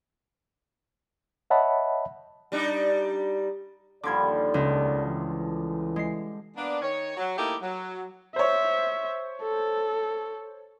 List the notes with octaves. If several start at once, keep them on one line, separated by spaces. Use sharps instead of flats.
C#5 D#5 E5 F#5 A5 B5
G3 D4 D#4
D#2 D3 F3 G3 D5 D6 G#6
C#2
E3
G#3 C7
A#3 B3 D4
D#3 C#5
F#3
A3 A#3 D#4 E4 G4
F#3
C5 C#5 E5
A4